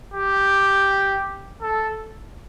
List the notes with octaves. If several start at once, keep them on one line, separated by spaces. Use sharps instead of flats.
G4
A4